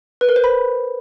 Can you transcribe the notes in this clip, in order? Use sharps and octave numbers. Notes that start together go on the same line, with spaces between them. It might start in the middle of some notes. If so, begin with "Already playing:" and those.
B4
A#4
C5
B5